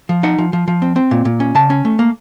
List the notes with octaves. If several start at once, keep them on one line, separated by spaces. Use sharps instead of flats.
F3
D#4 F#5
F3
F3
F3
C4
C4
A#2
A#2
C#4
C#3 A5
C#4
A3
A#3